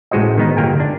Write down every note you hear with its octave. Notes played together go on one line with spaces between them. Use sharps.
A1 E3 G#3 F#4 C5 D#5
D#3 B3 D#4
G1 A#3 A#4 G5 G#5
D4